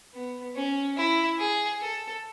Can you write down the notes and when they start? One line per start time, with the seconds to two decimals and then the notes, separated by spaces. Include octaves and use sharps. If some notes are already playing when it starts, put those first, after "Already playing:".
0.14 B3
0.55 C#4
0.97 E4
1.38 G#4
1.80 A4